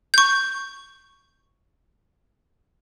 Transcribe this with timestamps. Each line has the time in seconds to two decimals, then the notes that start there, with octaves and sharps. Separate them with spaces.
0.14 C#6 G6